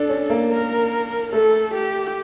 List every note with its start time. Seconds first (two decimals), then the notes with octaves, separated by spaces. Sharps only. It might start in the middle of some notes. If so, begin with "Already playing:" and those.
Already playing: D4 A4
0.09 C#4
0.30 A#3
0.50 A#4
1.32 A3 A4
1.74 G4